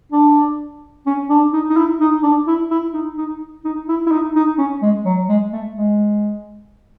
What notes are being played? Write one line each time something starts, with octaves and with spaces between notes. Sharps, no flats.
D4
C#4
D4
D#4
D#4
E4
D#4
D4
E4
E4
D#4
D#4
D#4
E4
E4
D#4
D#4
C#4
G#3
F#3
G#3
A3
G#3